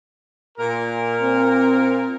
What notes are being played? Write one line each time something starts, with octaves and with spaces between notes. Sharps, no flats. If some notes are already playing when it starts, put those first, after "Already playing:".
A#2 A#4
C4